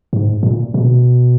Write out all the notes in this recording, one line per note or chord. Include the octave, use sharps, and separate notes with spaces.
G#2
A#2
B2